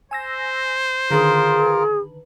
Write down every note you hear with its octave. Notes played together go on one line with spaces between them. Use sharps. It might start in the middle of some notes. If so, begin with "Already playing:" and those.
C5 G#5 E6 A#6
D3 D#3 F4 G#4 A#4 B4